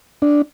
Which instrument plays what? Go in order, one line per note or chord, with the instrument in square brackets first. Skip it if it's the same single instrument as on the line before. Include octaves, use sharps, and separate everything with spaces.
[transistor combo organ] D4